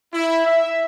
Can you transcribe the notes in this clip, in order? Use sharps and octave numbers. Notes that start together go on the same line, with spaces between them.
E4
E5